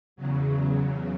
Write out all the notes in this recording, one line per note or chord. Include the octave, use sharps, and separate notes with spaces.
E2 C#3 F#3